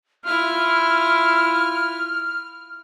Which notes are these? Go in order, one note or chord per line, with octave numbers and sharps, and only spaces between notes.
E4 F4 F6